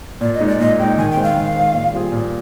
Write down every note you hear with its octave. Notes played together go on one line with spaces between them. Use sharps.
A#2 D5
D#5
G#3 D#4
D5
A#2 D#5
G#3 D#4 G5
D#3 G#5
G5
G#3 C4
F5
D#3
G#3 C4
A#2
G3 C4 F4 G#4
A#2